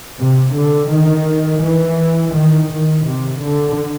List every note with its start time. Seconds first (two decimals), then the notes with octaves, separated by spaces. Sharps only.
0.20 C3
0.55 D3
0.91 D#3
1.63 E3
2.34 D#3
2.71 D#3
3.07 C3
3.42 D3